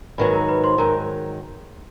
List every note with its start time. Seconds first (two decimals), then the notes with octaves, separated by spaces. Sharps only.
0.18 G#2 D#3 F#3 B4 B5
0.33 A#4 A#5
0.49 B4 B5
0.64 C5 C6
0.78 G#2 D#3 F#3 A#4 A#5